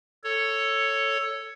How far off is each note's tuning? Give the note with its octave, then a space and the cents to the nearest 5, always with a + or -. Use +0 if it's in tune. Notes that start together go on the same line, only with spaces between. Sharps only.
A4 +10 C#5 +0